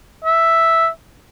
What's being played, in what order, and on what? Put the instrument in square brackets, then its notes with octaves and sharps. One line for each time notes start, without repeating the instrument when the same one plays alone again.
[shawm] E5